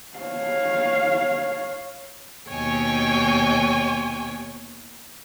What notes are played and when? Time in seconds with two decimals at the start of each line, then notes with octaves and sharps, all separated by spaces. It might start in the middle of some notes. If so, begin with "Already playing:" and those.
0.18 C#5 F5
2.49 D#2 B2 C#5 G5 G#5